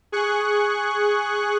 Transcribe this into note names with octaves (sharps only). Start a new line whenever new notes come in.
G#4 C#6 F#6